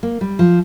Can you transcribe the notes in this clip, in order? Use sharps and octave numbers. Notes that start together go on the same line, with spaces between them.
A#3
G3
F3